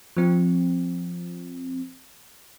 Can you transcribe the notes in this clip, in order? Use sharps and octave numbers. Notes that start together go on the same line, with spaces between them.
F3 C4